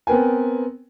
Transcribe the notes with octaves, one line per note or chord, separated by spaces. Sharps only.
B3 C4 A#4 B4 G5 G#5